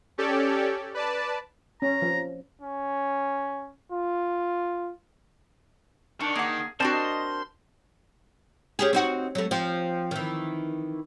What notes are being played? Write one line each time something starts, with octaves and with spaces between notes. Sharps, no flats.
C#4 G4 A4 C#5 D5
B4 D5 A5
C#4 A#5
F3
C#4
F4
D#3 D4 C#6
A#3 G#4 F#5
C4 D4 F#4 A#4 C5 D5 A5 C6
D#5
C#4 G4 G#4
C4 D#4 F#4
F#3 A3
F3 C4
D#3 E3